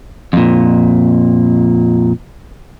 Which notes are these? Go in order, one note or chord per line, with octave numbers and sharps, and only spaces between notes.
F2 A#2